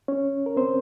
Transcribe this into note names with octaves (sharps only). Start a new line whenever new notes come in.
C#4 C#5
A#4
C4 C5